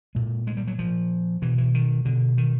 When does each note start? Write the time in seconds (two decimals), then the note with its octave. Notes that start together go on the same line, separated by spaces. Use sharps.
0.15 A#2 G#3
0.47 G#3
0.57 G3
0.67 F#3
0.79 A#2 F3
1.42 B2 E3
1.58 E3
1.74 D#3
2.05 B2 D3
2.38 D#3